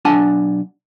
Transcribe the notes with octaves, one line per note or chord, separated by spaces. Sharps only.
B1 D4 F#5 G#5 A5